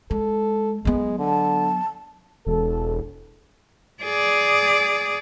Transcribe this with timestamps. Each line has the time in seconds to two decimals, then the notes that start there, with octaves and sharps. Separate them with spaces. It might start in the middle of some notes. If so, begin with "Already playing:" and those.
0.11 G#3 A4
0.85 F#3 G#3 B3
1.19 D3 A5
2.46 E1 A4
4.03 G#4 D5